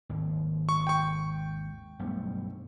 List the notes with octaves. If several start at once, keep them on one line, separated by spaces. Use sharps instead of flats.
G#1 D#2
C#6
G5 C#6
B1 G2 A3